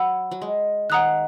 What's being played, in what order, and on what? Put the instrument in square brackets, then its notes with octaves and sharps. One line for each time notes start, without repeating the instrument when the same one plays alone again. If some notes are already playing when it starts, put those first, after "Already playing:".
Already playing: [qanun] F#3 [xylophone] F#5 B5 E6
[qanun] F#3
G#3
[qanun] D#3 [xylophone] F#5 A#5 D#6 F#6